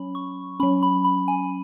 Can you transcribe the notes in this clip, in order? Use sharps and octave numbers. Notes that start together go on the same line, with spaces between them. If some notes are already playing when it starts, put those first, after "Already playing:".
Already playing: F#3 C#4 B5
C#6
F#3 C#4 B5
B5
B5
G#5